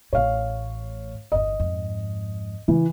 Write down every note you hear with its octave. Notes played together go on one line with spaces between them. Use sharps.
A1 A2 C#5 F5
G1 E2 D#5
F2 G#2
C#3 E3